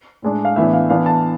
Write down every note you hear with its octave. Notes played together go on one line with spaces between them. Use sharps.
A2 G#3 D4
F5
A2 E3 B3 D4 E5
F5
E3 B3 D4 F5
A5